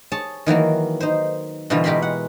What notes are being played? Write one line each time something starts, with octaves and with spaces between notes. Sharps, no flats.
G#4 C#5 A5
D#3 E3 F#3 A#3
D#4 C5
B2 D3 E3 G3 F4
B2 G#3 G4 A#4 B5 C6
F#5